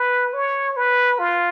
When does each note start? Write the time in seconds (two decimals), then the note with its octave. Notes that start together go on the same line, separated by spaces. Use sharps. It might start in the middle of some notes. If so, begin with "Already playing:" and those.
Already playing: B4
0.34 C#5
0.77 B4
1.19 F4